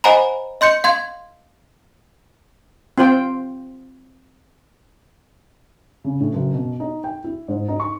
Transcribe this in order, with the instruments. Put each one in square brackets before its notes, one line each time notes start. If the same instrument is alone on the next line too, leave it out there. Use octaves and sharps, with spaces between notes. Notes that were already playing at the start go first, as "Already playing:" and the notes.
[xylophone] C5 D#5 F#5 G#5 A#5 B5
D#5 C6 G6 C#7
F5 C6 G#6
[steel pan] C4 F4 C5 G5
[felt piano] C#3
A2
F#1
B2
D#4
G5
E4
G#2
D#4
C#6